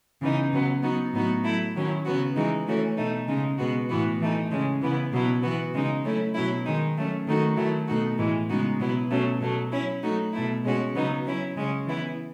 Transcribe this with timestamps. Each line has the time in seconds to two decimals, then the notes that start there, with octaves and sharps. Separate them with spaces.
0.21 C#3 E3 B3 D#4
0.52 C#3 F#3 B3
0.82 F#3 B3 D#4 F#4
1.13 A2 F#3 B3 D#4 F#4
1.44 F#3 A3 E4
1.75 D#3 F#3 C#4 E4
2.05 C#3 F#3 B3 F#4
2.36 E3 G#3 D#4 F#4
2.67 E3 A3 C#4 F#4
2.97 B2 A3 D#4
3.27 C#3 G#3 D#4
3.58 B2 G#3 B3 F#4
3.89 A2 E3 B3 F#4
4.20 E3 A3 D#4
4.51 C#3 G#3 C#4
4.81 C#3 E3 B3 E4
5.12 B2 F#3 B3 E4
5.43 E3 B3 F#4
5.74 C#3 G#3 D#4
6.04 F#3 A3 C#4 E4
6.34 B2 F#3 C#4 E4
6.65 D#3 G#3 D#4
6.96 F#3 A3 C#4
7.27 D#3 A3 D#4 F#4
7.57 D#3 F#3 A3 E4
7.88 B2 A3 D#4 F#4
8.18 A2 E3 G#3
8.49 C#3 G#3 B3 D#4 F#4
8.79 B2 F#3 B3 E4
9.10 B2 F#3 A3 C#4
9.40 B2 F#3 A3
9.72 F#3 C#4 E4
10.03 F#3 A3 D#4 F#4
10.33 B2 A3 E4
10.64 B2 G#3 C#4 F#4
10.94 C#3 F#3 B3 D#4
11.24 F#3 C#4 E4
11.55 C#3 G#3 C#4
11.86 E3 B3 E4